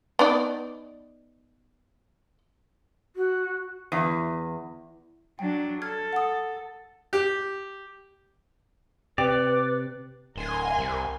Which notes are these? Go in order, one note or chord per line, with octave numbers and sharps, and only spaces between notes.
B3 D#4 D5
F#4
E2
F#3 D4 G5
A4 F6 G#6
F#5 D#6
G4
C3 B4 D5 G5
D1 A#4 G#5 C6
C2